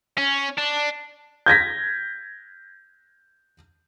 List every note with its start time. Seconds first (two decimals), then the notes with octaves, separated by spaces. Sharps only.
0.18 C#4
0.58 D4
1.46 G6 G#6 A#6 B6